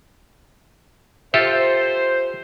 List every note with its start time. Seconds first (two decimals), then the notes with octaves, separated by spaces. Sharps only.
1.34 F4 G4 A4 C5 E5 E6